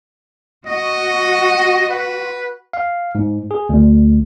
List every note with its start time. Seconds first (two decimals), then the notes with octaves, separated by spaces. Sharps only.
0.66 F#4 D#5
1.89 B4
2.73 F5
3.15 G#2
3.51 G#4
3.69 D2